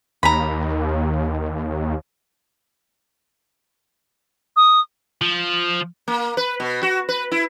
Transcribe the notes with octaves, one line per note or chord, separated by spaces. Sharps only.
D#2 A#5 B5
D#6
F3
A#3
B4
B2
F#4
B4
E4